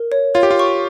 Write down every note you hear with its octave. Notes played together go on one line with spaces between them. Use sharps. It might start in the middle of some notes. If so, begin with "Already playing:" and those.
Already playing: A#4
C#5
F4 C#5
G4
F4
C#6